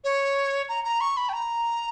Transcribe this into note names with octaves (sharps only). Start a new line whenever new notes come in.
C#5
A#5
A#5
C#6
B5
G5
A#5